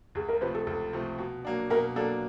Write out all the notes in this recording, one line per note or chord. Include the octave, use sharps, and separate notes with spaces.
C#2 G#4
A#4
C3 F3 A3 B4
A4
C#2 A4
C3 F3 A3
B2
F#3 A#3 D4
B2 A#4
F#3 A#3 D4 A4